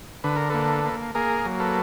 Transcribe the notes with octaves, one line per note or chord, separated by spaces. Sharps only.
D3 B4
A#4
A#3 A4 B4
A#3
A#3 G#4 A#4
F#3
A4 B4